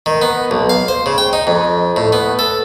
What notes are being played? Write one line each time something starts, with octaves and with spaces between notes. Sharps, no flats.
D#3
B3
B1
F5
C5
C#3
G5
D#4
F2
A2
B3
A4